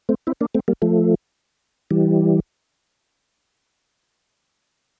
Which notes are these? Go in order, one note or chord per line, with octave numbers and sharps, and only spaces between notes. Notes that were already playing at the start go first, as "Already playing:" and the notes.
A3 C4
C4 E4
A#3 D4
A3 C4
G3 A#3
F3 A3
E3 G3